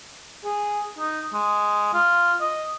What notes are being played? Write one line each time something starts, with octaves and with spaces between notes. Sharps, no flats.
G#4
D#4
G#3
F4
D#5